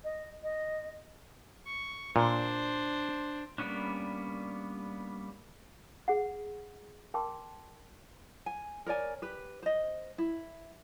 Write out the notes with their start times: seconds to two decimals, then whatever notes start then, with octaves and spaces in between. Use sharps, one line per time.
0.04 D#5
0.43 D#5
1.67 C#6
2.16 A#2 D4 C5
3.58 G3 A#3 B3 C#4 D4
6.08 G#4 F#5
7.14 A#4 G5 A5 C6 D6
8.46 G#5
8.86 A#4 C#5 D5 G#5
9.22 G4 B4
9.63 C5 D#5
10.18 E4